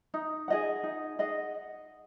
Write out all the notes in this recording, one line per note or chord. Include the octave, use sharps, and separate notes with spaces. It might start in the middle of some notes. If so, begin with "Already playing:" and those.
D#4
G#4 D#5 F#5
D#4
G#4 D#5 F#5